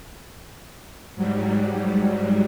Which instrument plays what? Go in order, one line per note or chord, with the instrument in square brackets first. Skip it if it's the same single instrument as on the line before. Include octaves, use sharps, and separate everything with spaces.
[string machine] G#2 F#3 G3